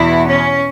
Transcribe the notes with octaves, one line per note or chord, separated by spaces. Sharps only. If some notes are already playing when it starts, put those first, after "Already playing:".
Already playing: E2 B2 B3 E4
C#4